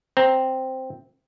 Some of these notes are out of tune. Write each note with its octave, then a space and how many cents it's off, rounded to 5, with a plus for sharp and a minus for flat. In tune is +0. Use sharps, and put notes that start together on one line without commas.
C4 +0 A#5 +10